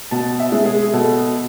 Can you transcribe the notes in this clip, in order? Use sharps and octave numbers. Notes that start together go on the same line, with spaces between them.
B2 A5
E5
G#3
G#4
B2 A4